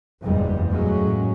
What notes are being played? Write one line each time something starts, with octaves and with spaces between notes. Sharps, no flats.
F#1 E2 G2 A#2 G3 G#3
A2 F#3 G#3 A#3 C#4